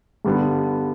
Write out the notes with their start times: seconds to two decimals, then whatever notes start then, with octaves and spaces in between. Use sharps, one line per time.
0.25 G2 D3 G3 B3 D4